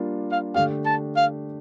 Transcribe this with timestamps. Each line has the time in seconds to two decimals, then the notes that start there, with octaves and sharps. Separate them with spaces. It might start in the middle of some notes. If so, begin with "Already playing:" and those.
Already playing: G3 A#3 D4 F4 A#4
0.32 F5
0.54 D3 A3 D4 G4 F5
0.86 A5
1.16 F5